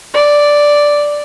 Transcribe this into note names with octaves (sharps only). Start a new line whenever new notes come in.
D5